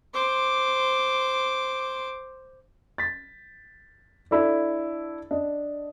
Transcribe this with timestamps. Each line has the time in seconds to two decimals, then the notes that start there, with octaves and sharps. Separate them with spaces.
0.14 C5 D6
2.98 A6 B6
4.31 D4 E4 A4 D5
5.31 D4 D#5